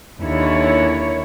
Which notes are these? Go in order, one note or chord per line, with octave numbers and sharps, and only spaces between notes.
D#2 D3 E4 C#5